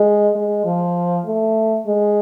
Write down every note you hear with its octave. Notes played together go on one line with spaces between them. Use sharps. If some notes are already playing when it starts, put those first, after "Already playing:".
Already playing: G#3
G#3
F3
A3
G#3